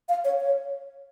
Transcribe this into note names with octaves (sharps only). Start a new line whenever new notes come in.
F5
C#5
C#5